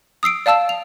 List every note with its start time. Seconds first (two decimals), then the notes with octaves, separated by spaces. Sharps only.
0.23 D#6 E6 C7 D7
0.46 D5 F5 A5 E6 E7
0.69 F7